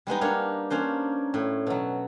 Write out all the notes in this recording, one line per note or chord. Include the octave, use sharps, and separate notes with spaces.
G3 G#3 B3 D#4
A#3 D4 D#4 A#4 C#5
A#3 C#4 D4 C5
A2
B2 F#3